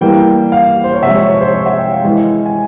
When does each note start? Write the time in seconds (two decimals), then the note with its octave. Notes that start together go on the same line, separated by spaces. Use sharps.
0.01 E3 G3 A#3 G5
0.52 F5
0.84 C5
0.94 C#5
1.02 C3 F3 G#3 E5
1.15 C#5
1.28 C#5
1.41 C5
1.54 C#5
1.66 E5
1.79 G5
1.92 F5
2.04 E3 G#3
2.46 G#5